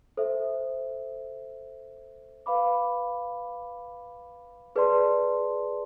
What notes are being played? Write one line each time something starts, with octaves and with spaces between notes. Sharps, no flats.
A4 C5 E5
B4 F5 B5 D6
G#4 B4 D5 A5 C6